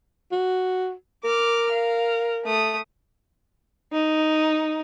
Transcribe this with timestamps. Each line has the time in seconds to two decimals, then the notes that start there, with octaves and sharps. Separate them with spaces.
0.32 F#4
1.24 A#4 D6 F6
1.71 F5
2.45 A3 D#6
3.94 D#4